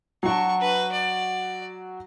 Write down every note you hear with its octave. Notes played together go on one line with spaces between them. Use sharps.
F#3 D4 F#4 C#6
B4
D5